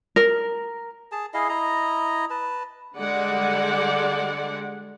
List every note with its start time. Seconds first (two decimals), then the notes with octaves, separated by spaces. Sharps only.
0.16 A#4
1.12 G#4 A5
1.34 E4 G#4 D#5 F5
1.49 E4 D#5 A#5
2.30 B4 A5
2.97 D3 G3 G#3 D5 F#5